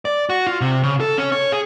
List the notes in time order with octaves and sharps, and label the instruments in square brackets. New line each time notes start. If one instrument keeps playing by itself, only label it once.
[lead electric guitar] D5
F#4
F4
C3
C#3
A4
C#4
C#5
G#4